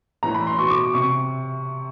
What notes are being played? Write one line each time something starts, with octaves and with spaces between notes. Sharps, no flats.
A2 E3 A#5
B5
C6
B2 C#6
D6
C3 C#6